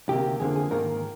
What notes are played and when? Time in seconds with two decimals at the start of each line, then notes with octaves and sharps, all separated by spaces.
0.09 D2 C3 D#3 A#3 G4
0.40 F2 D3 F3 A#3 G#4
0.56 G#4
0.70 G#2 D#3 A#3 A#4